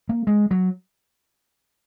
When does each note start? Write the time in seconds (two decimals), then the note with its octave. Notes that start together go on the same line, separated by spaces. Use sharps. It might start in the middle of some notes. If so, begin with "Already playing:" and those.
0.09 A#3
0.27 G#3
0.51 F#3